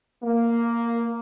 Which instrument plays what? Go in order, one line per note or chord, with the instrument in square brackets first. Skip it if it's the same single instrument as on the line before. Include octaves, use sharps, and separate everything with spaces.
[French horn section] A#3